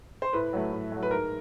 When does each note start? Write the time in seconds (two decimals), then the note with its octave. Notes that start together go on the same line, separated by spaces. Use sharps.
0.22 C5
0.33 A2 B4
0.53 F#3 A3
0.73 A2
0.92 F#3 A3
1.03 B4
1.11 G#2 A#4